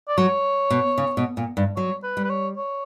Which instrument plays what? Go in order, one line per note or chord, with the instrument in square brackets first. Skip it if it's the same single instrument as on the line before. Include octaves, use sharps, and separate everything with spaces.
[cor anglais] D5
[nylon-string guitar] F#3 [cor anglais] C#5
[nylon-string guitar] B2
C#3
B2
A#2
G2
[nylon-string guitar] F#3 [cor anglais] C#5
[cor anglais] B4
[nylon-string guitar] G3
[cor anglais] B4
C#5
C#5